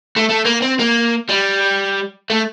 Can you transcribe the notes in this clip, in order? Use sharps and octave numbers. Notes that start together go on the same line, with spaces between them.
A3
A3
A#3
C4
A#3
G3
A3